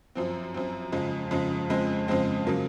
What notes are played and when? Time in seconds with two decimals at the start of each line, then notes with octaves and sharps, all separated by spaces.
0.15 F#2 F3 C4
0.54 F#2 F3 C4
0.92 F2 C#3 G#3
1.31 F2 C#3 G#3
1.70 F2 C#3 G#3 C4
2.08 F2 C#3 G#3 C4
2.47 C#3 F#3 A#3